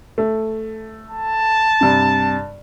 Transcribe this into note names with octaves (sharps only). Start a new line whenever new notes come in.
A3
A5
G2 C3